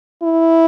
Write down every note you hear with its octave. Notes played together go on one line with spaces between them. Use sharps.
E4